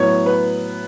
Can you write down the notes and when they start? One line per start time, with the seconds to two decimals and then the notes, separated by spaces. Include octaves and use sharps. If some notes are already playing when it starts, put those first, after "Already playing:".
Already playing: A2 F#3 B3 C#5
0.26 B4